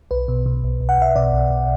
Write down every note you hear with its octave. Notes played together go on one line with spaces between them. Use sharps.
B1 B4
B2
B2
B1
B1
F#5
B1 E5
B2 D5
B1
B1